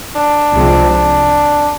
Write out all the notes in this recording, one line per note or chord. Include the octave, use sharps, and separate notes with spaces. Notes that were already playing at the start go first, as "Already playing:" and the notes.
D4
C2 C3 F3 G#3 C4
D4